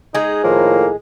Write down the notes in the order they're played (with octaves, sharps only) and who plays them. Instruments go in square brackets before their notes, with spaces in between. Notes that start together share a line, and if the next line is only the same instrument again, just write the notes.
[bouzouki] G#3 G#4 [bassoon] D#4
[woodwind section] A2 D#3 F3 [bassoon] A#3